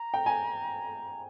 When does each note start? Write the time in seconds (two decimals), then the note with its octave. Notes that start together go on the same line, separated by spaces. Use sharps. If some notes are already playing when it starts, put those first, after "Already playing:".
Already playing: A#5
0.14 G5
0.26 G#5